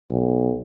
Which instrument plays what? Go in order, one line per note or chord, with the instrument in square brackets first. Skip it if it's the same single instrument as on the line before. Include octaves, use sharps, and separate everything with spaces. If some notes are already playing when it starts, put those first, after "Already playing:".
[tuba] B1